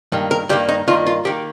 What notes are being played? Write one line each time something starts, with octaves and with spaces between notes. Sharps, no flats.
G2 D#3 A#3
A#4
G2 D#3 A#3 G4
D#4
G2 D#3 A#3 F4
F4
D#3 A#3 G4